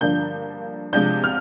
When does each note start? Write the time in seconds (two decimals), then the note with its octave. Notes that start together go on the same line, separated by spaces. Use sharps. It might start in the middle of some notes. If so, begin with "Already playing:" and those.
0.01 G2 D3 F3 A#3 D4 G6
0.93 C3 F3 G#3 D4 G6
1.24 F6